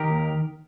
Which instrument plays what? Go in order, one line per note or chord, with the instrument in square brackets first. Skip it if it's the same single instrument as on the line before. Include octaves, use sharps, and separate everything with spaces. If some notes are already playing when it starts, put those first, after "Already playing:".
Already playing: [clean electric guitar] D#3 G4 A#4
D#2